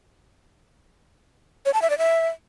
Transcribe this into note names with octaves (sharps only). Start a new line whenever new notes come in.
C#5
A5
E5
D5
E5